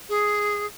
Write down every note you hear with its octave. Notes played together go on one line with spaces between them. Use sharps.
G#4